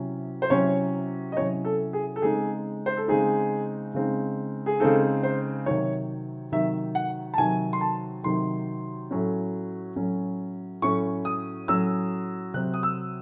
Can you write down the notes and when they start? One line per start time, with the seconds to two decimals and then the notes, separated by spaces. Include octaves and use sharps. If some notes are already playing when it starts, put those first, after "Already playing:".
Already playing: C3 F#3 C#4 E4
0.42 C5
0.50 C3 F#3 C#4 E4 C#5
1.32 D#5
1.36 C3 F#3 C#4 E4 C#5
1.65 A4
1.93 G#4
2.16 A4
2.22 C#3 G#3 C4 D#4 G#4
2.86 C5
2.97 A4
3.08 C#3 G#3 C4 D#4 G#4
3.94 C#3 G#3 C4 D#4
4.66 G#4
4.80 C#3 G#3 C4 D#4 A4
5.23 C5
5.66 C3 D#3 F#3 C#5
6.52 C3 D#3 F#3 E5
6.95 F#5
7.34 A5
7.38 C3 D#3 F#3 G#5
7.73 C6
7.81 A5
8.24 C3 D#3 F#3 C6
9.11 A2 F#3 C#4
9.96 A2 F#3 C#4
10.82 A2 F#3 C#4 C#6
11.25 D#6
11.68 A2 F#3 C#4 E6
12.54 C3 F#3 C4 F#6
12.74 D#6
12.83 E6